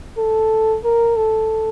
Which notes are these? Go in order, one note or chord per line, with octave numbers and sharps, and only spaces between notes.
A4
A#4
A4